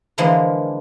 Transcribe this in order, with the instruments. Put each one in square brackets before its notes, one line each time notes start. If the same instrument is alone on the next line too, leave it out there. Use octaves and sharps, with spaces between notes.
[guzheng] D3 E3 F3 G#3 A#3